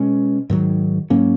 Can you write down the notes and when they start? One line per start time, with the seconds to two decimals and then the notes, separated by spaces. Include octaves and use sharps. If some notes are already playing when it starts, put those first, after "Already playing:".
Already playing: B2 G#3 C#4
0.50 G#2 D#3 F#3
1.10 G#2 F#3 A#3 C#4